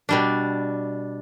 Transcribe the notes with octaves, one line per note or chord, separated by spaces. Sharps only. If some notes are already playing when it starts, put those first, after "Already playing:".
B2 G3 D4